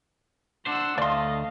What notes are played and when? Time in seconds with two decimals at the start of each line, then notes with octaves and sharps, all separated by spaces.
0.66 D4 C5 F#5 E6
0.98 D2 A3 D5 D#5 F5 C6